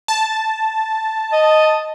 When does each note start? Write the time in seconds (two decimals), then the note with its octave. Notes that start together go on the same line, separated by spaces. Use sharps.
0.08 A5
1.32 D#5